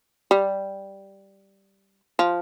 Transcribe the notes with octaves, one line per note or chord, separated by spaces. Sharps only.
G3
F3